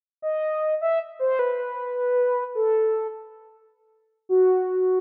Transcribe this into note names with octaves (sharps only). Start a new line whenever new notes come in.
D#5
E5
C5
B4
A4
F#4